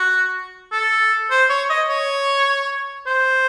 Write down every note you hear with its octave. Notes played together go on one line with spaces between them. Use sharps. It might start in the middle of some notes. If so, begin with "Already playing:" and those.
Already playing: F#4
A4
C5
C#5
D#5
C#5
C5